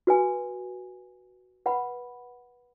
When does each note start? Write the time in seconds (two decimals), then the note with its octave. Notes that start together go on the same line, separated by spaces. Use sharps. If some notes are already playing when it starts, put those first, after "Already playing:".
0.07 F#4 B4 G#5
1.66 B4 F#5 B5